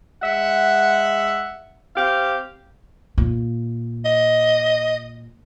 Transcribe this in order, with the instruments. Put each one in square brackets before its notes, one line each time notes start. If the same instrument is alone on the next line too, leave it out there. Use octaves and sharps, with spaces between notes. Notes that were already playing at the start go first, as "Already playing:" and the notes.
[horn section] G#3 E5 F#5
C4 G4 F5
[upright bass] A#2
[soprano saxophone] D#5